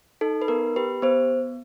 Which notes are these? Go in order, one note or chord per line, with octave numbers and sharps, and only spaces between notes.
D#4 A4
B4
B3 A#4
G4 B4
B3 C5